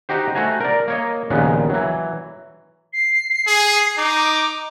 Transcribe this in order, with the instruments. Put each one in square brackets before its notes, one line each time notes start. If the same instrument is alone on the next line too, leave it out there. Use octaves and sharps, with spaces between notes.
[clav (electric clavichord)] D#4 F#4 G4 C5
A3 F#4 C5 G#5 A#5
A#4 D5
A#3 C#5 D#5
A#1 D#2 A#2 C#3 G#3 B3
E3 F#3
[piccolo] C7
[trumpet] G#4
[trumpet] D#4 [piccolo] D6